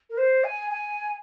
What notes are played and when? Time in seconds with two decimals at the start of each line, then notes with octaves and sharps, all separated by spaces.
0.10 A#4
0.18 C5
0.44 G#5
0.71 G#5